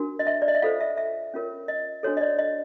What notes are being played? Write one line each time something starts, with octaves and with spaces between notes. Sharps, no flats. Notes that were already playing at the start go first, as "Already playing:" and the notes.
Already playing: D4 F#4 A#4
D#5
E5
D5
D#5
E5
F4 A4 C5 F5
E5
E5
C#4 F4 A#4 C#5
D#5
D4 F#4 A4 C#5
D#5
D5
D#5